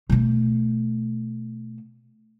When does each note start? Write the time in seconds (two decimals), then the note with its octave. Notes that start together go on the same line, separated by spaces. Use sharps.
0.10 B2 A3